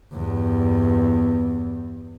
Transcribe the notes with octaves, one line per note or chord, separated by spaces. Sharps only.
E2 G2